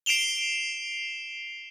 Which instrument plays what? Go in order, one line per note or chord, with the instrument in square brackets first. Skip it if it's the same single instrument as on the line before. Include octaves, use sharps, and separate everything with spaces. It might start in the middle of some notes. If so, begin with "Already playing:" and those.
[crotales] C7 D7 E7 F7 G7